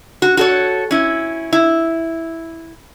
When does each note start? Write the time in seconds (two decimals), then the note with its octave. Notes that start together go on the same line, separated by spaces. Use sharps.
0.22 F#4
0.37 F#4 A4 C#5
0.91 C#4 E4
1.53 E4